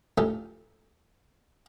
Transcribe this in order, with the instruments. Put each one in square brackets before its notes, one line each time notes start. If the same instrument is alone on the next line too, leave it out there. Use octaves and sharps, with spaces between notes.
[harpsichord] A#1 A2 C#3 D#4 G4 A4